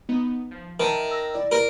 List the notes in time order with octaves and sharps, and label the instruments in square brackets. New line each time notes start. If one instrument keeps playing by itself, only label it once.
[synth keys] B3 D#4
F3
[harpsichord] D#3 [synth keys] A#4 E5 A5
[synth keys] E6 A#6
E4 D5
[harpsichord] A#4